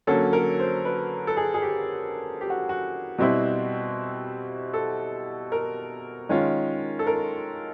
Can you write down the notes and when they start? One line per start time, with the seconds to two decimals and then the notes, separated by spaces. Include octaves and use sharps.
0.07 D3 F#3 A#3 C#4 A4
0.33 A#4
0.59 C5
0.85 B4
1.27 A4
1.37 G#4
1.54 G#4
1.62 G4
2.41 G4
2.50 F#4
2.69 F#4
3.18 B2 G3 C4 E4
4.74 A4
5.52 A#4
6.29 D#3 G#3 C#4 F4
6.99 A4
7.07 A#4